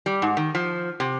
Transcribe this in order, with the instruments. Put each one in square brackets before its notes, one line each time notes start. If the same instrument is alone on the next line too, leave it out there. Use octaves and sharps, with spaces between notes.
[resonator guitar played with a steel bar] G3
G#2
D#3
F3
C3